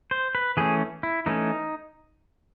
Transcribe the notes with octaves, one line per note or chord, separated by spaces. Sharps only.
C5
B4
E3 A3 C#4 G#4
E4
E3 A3 C#4 D#4